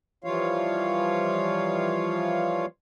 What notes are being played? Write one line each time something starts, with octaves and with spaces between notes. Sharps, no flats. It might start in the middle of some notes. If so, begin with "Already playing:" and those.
E3 F3 G3 F4 C#5 F5